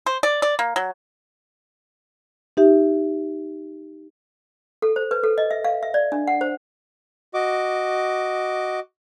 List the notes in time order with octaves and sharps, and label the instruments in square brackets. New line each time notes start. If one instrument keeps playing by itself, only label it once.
[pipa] C5
D5
D5
A#3
F#3
[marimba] D#4 G4 E5
[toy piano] A4
C5
B4
A4
D#5
E5
F5
E5
D5
D4
F#5
C5
[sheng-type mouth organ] F#4 D#5 D6